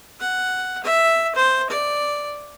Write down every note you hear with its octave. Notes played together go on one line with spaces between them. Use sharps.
F#5
E5
C5
D5